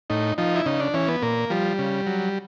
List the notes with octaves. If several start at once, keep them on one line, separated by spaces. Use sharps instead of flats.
A2 D#4
F3 D#4
E4
C#3 D#4
D4
E3 C#4
B3
A#2 A#3
F3 G3
C#3
F#3